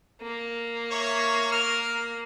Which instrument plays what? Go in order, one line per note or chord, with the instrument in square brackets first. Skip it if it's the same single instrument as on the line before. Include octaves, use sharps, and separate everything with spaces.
[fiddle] A#3
[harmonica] C#5 E5 C#6
A#4 F6